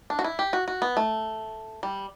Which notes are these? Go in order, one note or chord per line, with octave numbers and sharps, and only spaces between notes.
D4
F#4
E4
G4
F#4
F#4
B3
A3
G3